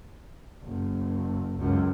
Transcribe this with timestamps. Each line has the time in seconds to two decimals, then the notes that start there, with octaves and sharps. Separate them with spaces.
0.64 F#1
1.59 C#2 F#2